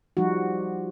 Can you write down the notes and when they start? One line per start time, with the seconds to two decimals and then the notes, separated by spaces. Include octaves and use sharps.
0.17 F3 G3 D#4 F#4